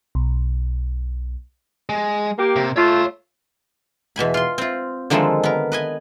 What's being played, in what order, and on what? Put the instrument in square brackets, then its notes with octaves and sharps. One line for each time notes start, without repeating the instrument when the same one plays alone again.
[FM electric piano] B1
[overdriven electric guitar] G#3
[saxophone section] A#3 G4
[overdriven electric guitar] C3
[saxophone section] A3 F4 [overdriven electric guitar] C#5 C6
[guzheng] E2 B2 G#5 B5
F4 C6
C4 F4
D3 D#3 F3 G#3 D#4 A4
B3 A#4
B4 D#5 G#5